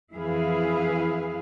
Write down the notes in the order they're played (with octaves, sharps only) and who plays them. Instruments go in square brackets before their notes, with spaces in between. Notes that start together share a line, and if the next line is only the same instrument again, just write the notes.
[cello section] F2 E3 E4 G#4 B4 F5